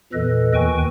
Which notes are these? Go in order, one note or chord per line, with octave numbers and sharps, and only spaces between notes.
E2 A#2 E3 A4 B4 D#5
D#2 D#3 B4 G5 G#5 C#6